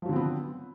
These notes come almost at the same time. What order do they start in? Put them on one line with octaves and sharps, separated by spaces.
F3 F#3 D3 C4 B3